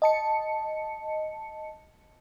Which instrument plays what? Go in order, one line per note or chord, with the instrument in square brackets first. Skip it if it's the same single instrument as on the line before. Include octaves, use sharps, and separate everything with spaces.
[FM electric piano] D#5 A5 C#7